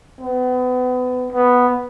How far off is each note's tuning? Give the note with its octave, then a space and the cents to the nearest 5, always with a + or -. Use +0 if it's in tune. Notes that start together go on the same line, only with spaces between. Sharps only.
B3 +30
B3 +0